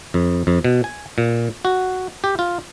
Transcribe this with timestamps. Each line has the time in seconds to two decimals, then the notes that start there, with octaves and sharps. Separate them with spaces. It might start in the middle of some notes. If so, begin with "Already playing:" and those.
0.14 F2
0.47 F2
0.64 B2
0.84 G#5
1.18 A#2
1.65 F#4
2.24 G4
2.39 F4